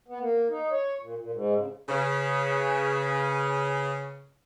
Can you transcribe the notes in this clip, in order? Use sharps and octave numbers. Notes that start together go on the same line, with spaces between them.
B3
A#3
D#4
C#5
A#2
A#2
G#2
C#3
C#3 B4 G#5